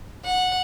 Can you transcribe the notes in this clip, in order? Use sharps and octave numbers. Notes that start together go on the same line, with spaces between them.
F#5